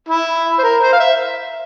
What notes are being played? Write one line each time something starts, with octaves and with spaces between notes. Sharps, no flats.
E4
C5
A#4
C5
F5
E5